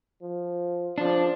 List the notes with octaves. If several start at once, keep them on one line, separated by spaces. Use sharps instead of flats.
F3
F3 D4